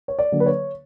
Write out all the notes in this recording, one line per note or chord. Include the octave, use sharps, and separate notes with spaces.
C#5
D5
D3 F#3 A#3
B4
C#5